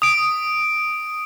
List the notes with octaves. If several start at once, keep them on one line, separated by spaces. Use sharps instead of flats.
D#6 D7